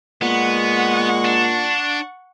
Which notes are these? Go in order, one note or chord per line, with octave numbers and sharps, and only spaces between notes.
A#2 G#3 B3 F#5 C#6
D4